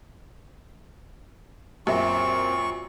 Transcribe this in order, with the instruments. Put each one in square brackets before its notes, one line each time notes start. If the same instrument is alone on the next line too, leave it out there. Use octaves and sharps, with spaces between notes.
[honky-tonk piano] F#2 A#2 [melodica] C4 [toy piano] G4 E5 [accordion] C#6